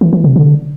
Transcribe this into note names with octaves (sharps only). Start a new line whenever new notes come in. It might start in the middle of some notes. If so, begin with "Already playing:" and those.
E3
E3
C3
D3